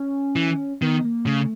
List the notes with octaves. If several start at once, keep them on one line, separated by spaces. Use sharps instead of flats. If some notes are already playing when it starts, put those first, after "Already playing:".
Already playing: C#4
E3
D#3 B3
A#3
C#3 A3